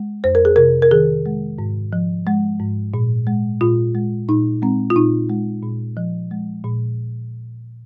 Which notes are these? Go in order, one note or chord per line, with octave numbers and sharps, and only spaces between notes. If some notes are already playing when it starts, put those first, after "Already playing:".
Already playing: G#3
F2 C5
A#4
G#4
C3 A#4
A#4
D#3 G#4
G#3
G#2
F3
G#3
G#2
A#2
G#3
A#2 F4
G#3
A#2 D#4
G#3 C4
F4
A#2 D#4
G#3
A#2
F3
G#3
A#2